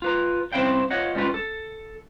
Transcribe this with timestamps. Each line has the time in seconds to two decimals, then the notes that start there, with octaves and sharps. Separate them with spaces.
0.02 F4 B4 A#5
0.52 C2 C4 C#4 E4 F5 G5
0.90 F4 C#5 D#5 F#5
1.15 G3 G#3 C#4 F4 B4
1.34 A4